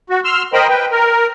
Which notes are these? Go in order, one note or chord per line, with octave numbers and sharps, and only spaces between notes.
F#4
C6 E6 F6
A#4 C5 D#5 G5 B5
B4 G5
A#4